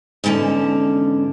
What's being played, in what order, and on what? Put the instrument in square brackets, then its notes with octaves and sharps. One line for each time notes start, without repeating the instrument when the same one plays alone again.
[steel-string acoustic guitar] E2 G#2 D3 C#4 A5